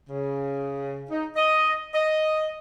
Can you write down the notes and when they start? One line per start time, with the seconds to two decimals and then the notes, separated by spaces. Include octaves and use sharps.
0.09 C#3
1.11 D#4
1.36 D#5
1.94 D#5